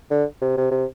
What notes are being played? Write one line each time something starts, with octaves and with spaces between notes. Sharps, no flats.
D3
C3
C3
C3